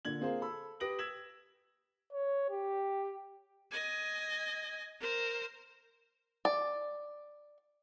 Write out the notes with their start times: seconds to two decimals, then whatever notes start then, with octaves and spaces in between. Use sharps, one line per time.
0.05 A#2 D3 G#6 F#7
0.21 A#3 C4 F4 G#4 A#4 C5
0.41 A4 B5 E6
0.80 G4 B4 D#6 A#6 D7 F#7
0.99 E6 G#6 B6 E7 F#7
2.13 C#5
2.50 G4
3.71 D#5 G#5
5.00 A#4 C5
6.45 D5